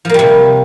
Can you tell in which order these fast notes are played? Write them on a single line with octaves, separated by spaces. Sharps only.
F3 A#3 G3 C3